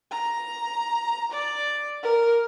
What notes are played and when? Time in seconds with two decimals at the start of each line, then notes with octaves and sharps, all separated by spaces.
0.12 A#5
1.32 D5
2.03 A#4